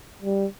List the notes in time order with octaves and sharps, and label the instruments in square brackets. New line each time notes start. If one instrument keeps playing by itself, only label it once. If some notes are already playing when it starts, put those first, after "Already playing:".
[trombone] G3